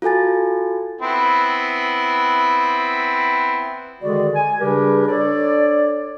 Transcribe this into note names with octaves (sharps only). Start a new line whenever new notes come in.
F4 F#4 A4 G#5 A6
B3 C4 E4
D3 D#3 G#3 F#4 G#4 D5
G#5
C#3 G3 D4 G4 A#4 B4
D4 A4 C#5 D5